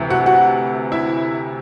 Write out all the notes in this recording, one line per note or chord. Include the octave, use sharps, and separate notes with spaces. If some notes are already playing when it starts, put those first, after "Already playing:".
Already playing: D2 C3 E3
F#4 F#5
F#4 F#5
E4 E5